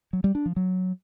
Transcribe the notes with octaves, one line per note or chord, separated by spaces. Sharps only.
F#3
G3
D4
F3
F#3